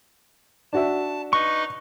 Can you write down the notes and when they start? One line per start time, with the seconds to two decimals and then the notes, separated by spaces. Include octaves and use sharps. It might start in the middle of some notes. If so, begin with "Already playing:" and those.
0.73 D4 F#4 E5 A5
1.33 D#4 B4 D#5 C#6